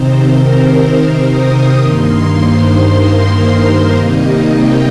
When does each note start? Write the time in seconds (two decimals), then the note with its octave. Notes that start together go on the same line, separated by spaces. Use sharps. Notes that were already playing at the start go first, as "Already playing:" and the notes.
Already playing: C3 D#3 C4 D#4 C5
0.20 A#4
0.75 C5
1.27 D#6
1.80 G2 D#3 A#3 D#4 C6
2.34 C5
2.87 A#4
3.41 C5
3.93 C3 D#3 G3 A#3 D#4 D#5
4.46 G5